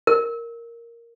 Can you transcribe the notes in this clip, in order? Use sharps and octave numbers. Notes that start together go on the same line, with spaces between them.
A#4